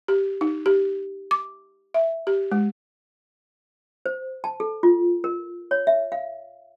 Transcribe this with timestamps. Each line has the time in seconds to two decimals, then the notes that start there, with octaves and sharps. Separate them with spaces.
0.08 G4
0.41 D#4
0.66 G4
1.31 D6
1.94 E5
2.27 G4
2.51 G#3
4.06 C5
4.44 A5
4.60 A4
4.83 F4
5.24 A#4
5.71 C#5
5.87 E5
6.12 F5